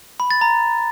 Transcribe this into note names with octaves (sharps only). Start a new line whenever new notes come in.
B5
A6
A#5